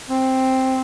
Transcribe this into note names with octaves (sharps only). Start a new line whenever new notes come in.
C4